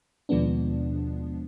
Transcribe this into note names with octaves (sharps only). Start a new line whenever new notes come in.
D#2 B2 F3 G#3 B3 D4